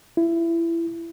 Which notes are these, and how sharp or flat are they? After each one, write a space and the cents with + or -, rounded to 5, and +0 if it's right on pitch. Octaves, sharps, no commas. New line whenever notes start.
E4 +20